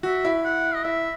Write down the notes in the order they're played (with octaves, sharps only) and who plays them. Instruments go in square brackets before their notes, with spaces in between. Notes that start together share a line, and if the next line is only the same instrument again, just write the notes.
[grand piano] F#4 [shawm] E5
[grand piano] E4
[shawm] F#5
D#5
[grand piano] E4 [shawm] E5